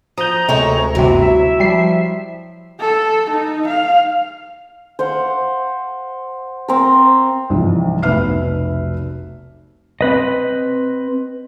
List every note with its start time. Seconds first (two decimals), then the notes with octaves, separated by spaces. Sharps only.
0.18 F3 A#5 D#6 G6
0.49 D2 C3 G#3 A4 C#5
0.95 G1 C3 F#3 E4
1.20 E5
1.60 F3 G3 C7
2.80 A4
3.30 D#4
3.67 F5
4.99 C5 F5 F#5
6.68 C4 A#4
7.50 C2 G#2 E3 F3
8.03 F1 B1 B4 E5 F6 C7
10.01 C4 B4 D#5